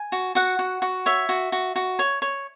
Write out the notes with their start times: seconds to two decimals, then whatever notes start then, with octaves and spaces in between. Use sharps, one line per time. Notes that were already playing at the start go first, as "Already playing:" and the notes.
Already playing: G#5
0.12 F#4
0.35 F#4 F#5
0.59 F#4
0.82 F#4
1.06 C#5 E5
1.29 F#4
1.52 F#4
1.76 F#4
1.99 C#5
2.22 C#5